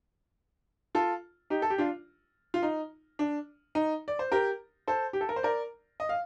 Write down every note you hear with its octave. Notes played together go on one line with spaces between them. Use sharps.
F4 A4
D#4 G4
A4
G4
D4 F4
F4
D#4
D4
D#4
D5
C5
G4 A#4
A4 C5
G4
A4
A#4
C5
A#4 D5
D#5
F5